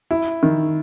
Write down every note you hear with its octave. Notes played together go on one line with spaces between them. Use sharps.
E4
D#3